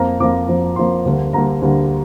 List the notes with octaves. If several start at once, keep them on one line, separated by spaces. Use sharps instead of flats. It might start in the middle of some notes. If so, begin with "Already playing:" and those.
Already playing: F2 F3 A#3 A#5
F2 F3 A#3 D6
F2 F3 A#3
F2 F3 A#3 C6
D2 D3 G3 A#3
D2 D3 G3 A#3 A#5
D2 D3 G3 A#3